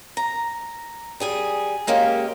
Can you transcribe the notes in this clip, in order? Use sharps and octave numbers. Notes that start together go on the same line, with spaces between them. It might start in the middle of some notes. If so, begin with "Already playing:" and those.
A#5
G3 G#4 G#5
G#3 A#3 C#4 G4